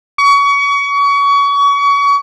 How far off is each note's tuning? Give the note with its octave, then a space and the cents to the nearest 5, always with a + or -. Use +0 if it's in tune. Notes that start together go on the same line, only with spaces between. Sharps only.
C#6 +30